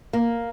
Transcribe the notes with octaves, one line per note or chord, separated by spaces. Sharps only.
A#3